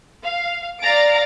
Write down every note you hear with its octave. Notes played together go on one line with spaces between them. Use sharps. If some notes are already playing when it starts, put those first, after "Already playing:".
F5
D5 F5 A#5 A6 D7